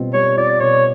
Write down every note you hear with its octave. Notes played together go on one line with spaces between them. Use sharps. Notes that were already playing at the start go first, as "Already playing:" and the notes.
Already playing: B2 G3 C4 F4
G3 C#5
F4 D5
B2 C#5